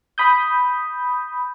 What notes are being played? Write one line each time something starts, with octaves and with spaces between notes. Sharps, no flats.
B5 D#6 G6